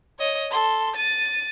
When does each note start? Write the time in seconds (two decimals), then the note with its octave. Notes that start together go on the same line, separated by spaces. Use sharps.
0.19 C#5 D#5
0.50 A4 C6
0.96 A6 D#7